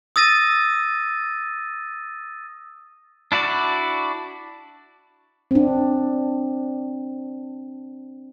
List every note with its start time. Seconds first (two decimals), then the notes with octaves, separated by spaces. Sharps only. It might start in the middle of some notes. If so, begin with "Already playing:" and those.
0.16 D#6 E6 A6 A#6 D#7
3.32 D4 E4 F#4 D5
5.51 C4 D4